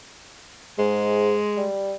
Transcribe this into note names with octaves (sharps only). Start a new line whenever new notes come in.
G#2 G#3
G3